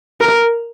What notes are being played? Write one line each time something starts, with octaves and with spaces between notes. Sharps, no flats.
A#4